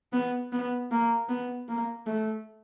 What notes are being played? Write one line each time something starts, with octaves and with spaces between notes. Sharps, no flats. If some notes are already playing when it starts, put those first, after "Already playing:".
B3
B3
A#3
B3
A#3
A3